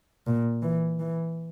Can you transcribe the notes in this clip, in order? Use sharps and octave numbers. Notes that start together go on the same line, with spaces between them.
A#2
E3
E3